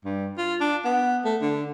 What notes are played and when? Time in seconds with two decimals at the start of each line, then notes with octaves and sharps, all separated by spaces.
0.05 G2
0.38 F4
0.60 D4
0.85 B3
1.25 A3
1.41 D3